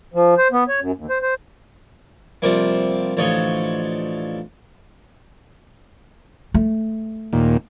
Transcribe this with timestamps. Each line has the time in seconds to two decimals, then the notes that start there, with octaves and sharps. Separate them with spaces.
0.14 F3
0.38 C5
0.52 B3
0.68 C#5
0.80 F#2
0.96 D#2
1.10 C5
1.22 C5
2.42 C3 F3 G3 A#3
3.17 A1 D3 F3 C#5 D#5
6.54 A3
7.33 D#2 A#2